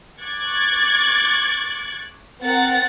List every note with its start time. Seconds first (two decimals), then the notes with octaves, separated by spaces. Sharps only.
0.22 C#6 D6 F#6 G#6 A6
2.41 C4 A#4 F#5 A6